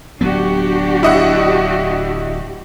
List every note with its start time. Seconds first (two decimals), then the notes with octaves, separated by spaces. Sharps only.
0.21 D1 F#3 B3 D4 F#4 G4
1.03 E4 D#5 F#5